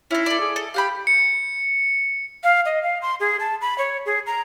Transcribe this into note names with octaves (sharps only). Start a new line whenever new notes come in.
C#4 D#4 E4
A4 D5
G#4
A4 D#5
G4 F5 F#5 B5
C#7
F5
D#5
F5
C6
G#4
A5
B5
C#5
G#4
A#5